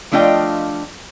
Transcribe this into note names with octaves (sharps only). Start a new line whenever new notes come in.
F3 A3 D4 F4 D#5 G5